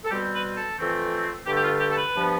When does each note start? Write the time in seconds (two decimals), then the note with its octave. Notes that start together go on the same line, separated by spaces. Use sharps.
0.04 A4
0.11 B2 G3 C4 G4
0.34 B4
0.56 A4
0.78 F2 E3 A3 C4
1.46 G2 D3 A3 G4
1.56 G4
1.63 F4
1.80 G4
1.91 A4
1.97 B4
2.14 G2 F3 B3